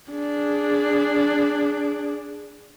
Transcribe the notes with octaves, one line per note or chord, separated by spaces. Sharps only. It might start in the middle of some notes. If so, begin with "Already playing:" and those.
D4 G#4